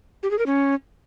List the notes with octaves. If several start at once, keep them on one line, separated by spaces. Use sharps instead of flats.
G4
G#4
A#4
C#4